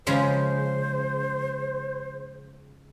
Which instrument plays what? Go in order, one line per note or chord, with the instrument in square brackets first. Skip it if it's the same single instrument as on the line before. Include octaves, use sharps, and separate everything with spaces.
[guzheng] C#3 F3 G#3 [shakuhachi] C5